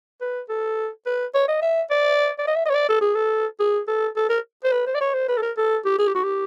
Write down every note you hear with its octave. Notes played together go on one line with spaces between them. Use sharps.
B4
A4
B4
C#5
D#5
E5
D5
D5
D#5
E5
D#5
C#5
D5
A4
G#4
A4
G#4
A4
A4
A#4
C5
B4
C5
D5
C#5
C5
B4
A4
A#4
A4
G4
G#4
G4
F#4
G4